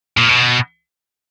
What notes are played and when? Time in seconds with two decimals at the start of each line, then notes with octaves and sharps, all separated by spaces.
0.17 A#2
0.29 B2